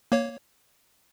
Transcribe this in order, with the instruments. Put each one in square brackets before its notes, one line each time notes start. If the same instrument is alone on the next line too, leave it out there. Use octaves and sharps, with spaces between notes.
[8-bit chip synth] A#3 C#5